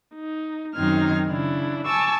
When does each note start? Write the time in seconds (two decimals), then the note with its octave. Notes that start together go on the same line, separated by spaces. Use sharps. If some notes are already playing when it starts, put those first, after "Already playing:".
0.15 D#4
0.75 F#2 D#3 C4 D#4 F6 G#6
1.27 C#3 D4 E4
1.85 G#5 A5 C#6 D6 E6